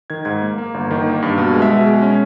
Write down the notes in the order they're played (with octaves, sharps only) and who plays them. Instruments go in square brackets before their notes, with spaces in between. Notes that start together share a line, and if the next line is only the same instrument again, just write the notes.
[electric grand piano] D#3 G#6
G#2 G#6
A#3
A#3
G1
D#3
A#3
G2
B2
G#3
E5
B2
G#3
C#4